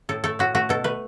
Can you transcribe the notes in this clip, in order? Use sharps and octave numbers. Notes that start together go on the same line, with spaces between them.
A2 A4
A3 A4
A2 F#4
A3 F#4
B2 A4
A3 B4